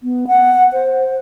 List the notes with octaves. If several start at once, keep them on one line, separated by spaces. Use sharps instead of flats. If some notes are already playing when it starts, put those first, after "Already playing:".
B3
F#5
C5